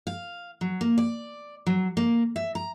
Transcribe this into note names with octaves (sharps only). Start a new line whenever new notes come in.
F5
F#3
A#3
D5
F#3
A#3
E5
A#5